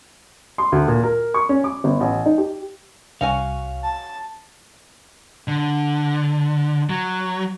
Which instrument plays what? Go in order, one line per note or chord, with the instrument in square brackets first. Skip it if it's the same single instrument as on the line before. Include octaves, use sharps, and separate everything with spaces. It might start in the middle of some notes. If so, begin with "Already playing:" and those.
[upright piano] C6
D2
A#2
A#4
C#6
C#4
D6
G1
A1
D#4
G4
[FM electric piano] C2 [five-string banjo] C#4 F#4 G#5 [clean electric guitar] F5
[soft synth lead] A5
[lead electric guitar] D3
F#3